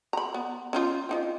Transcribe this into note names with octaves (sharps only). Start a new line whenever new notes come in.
A#5 B5
B3
C#4 D#4 F4
C4 D#4 F4